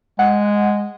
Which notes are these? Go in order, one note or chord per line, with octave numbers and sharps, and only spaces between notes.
G#3 F#5